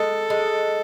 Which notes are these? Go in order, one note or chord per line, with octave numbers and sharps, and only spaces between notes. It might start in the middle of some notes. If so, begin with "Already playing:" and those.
Already playing: G#3 A4
G#3